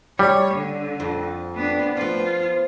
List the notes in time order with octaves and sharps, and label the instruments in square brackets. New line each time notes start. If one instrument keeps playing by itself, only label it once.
[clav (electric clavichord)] G3 [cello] C#5
[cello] D3
[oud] F2
[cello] B3 D4
[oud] F3 B3 [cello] F4